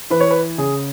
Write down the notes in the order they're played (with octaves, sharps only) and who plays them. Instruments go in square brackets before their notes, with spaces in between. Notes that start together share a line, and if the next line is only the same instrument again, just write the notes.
[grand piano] E3 B4
C#5
B4
C#3 G#4